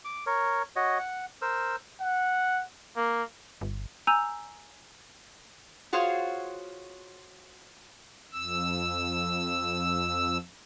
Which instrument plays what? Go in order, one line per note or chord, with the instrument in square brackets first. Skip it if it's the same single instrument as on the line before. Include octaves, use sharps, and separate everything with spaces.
[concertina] D6
A#4 C#5
F#4 C#5 D#5
F#5
A#4 C5 E6
[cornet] F#5
A#3
[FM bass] G1
[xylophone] G#5 A#5 E6 G6 D#7 F7
[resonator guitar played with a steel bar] F4 F#4 G#4 C5 C#5 F5
[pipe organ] F2 E6